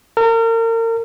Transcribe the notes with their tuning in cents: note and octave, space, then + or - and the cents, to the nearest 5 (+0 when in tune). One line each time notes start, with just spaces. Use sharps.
A#4 -35